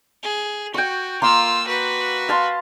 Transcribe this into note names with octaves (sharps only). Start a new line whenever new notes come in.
G#4
F#4 G5 C#6
A#3 F4 A#4 C6 E6
F#4 B4
F5 A5 C6